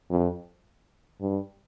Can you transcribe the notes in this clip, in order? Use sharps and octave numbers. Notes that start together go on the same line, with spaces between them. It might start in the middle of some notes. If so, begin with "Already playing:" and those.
F2
G2